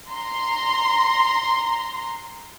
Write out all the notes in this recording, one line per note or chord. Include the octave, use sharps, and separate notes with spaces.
A#5 C6